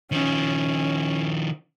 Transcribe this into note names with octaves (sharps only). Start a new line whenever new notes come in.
D#3 F3 C#4